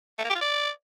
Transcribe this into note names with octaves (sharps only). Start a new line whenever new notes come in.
A3
A#3
G4
F4
D5